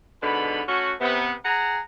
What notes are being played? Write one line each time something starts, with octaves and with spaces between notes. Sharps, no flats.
G#2 B2 D3 B5
A3 C#4 F#4
C3 B3
G#4 F#5 A#5